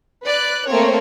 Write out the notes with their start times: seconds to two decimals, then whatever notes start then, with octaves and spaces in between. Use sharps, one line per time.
0.23 B4 D5 F#6
0.68 A3 A#3 C4 C#5